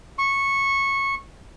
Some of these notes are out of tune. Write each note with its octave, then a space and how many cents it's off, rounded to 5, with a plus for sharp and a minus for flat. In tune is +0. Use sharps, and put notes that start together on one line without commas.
C#6 -15